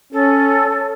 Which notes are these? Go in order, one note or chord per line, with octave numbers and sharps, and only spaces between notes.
C#4 A4